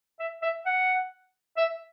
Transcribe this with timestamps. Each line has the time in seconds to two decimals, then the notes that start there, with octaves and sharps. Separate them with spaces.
0.20 E5
0.43 E5
0.66 F#5
1.57 E5